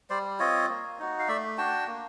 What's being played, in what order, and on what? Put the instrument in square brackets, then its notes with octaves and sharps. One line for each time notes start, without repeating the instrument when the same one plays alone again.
[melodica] G3 C5 D5
C4 F4 C#5 D#5
A#3
D#4 F#4
F5
A3 D5 E5
D4 F#4 G5 A5
A#3